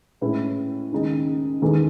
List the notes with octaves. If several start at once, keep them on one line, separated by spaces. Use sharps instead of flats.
A2 G#3 C#4 E4 B4
D#2 C#3 G#3 D#4
E2 D#3 G#3 D#4 A4